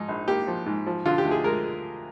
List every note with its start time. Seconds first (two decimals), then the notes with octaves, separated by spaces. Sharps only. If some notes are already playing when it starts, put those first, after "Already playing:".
Already playing: G#2 F3 D#4
0.08 A#1
0.28 A#3 G4
0.47 F3
0.66 G#2
0.86 F3
1.06 D3 F4
1.18 G4
1.25 D2
1.31 G#4
1.44 G#3 A#4